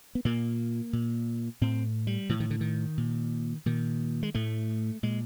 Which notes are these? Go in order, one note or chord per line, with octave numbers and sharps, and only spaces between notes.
B3
A#2 A#3
A#2
A2 C4
G3
A2 E3
D#3
D3
D#3
A#2
A#2 D#3
G#3
A2 A3
A#2 G#3